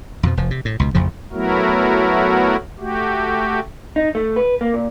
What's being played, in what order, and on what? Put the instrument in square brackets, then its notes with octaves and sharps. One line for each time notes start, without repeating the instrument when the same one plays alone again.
[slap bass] F2 B2 F3
F1 F3
C3
A2
C#2 B2
A1 F2 C#3 F3
[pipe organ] F#3 A3 B3 E4 F#4 A#4
A3 F#4 G4
[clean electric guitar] D#4
A3
B4
A#3
A#2